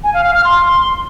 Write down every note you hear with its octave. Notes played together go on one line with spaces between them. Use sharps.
G#5
F5
F5
F6
C6